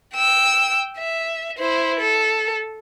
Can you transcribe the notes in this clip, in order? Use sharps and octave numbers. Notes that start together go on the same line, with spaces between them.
G5 E6
E5
E4 C5
A4